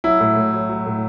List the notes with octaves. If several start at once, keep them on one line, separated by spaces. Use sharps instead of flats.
F#3 E4
A2
A2
F#3
F#3
A2